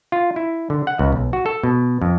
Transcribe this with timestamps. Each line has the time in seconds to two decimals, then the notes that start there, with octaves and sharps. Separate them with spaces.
0.12 F4
0.36 E4
0.70 D3
0.87 F#5
0.99 C#2
1.13 B1
1.33 F#4
1.46 A4
1.63 B2
2.02 F2